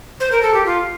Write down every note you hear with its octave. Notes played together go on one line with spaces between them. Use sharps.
C5
A#4
A4
G4
F4